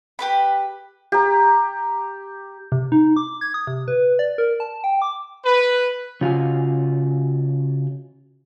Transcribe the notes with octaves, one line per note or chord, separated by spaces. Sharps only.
G4 B4 B5
G4 A#5
C3
D#4
D6
G#6
D#6
C3
B4
D5
A#4
A5
G5
D6
B4
C#3 F4 F#4 G#5